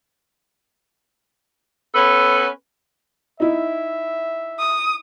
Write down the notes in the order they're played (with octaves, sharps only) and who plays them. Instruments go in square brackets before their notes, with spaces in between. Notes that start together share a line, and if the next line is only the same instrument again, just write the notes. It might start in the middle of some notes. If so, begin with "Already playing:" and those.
[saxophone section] B3 C#4 A4 B4
[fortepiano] D#4 E4 [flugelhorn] E5
[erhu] D#6